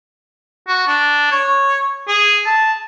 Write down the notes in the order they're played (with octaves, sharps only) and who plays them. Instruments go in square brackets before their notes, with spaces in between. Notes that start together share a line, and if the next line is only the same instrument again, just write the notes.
[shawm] F#4
D4
C#5
G#4
A5